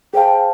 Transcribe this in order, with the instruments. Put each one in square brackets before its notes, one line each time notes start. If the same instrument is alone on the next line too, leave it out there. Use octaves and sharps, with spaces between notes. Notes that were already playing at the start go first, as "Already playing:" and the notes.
[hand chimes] G#4 C5 F5 A5 [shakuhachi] G5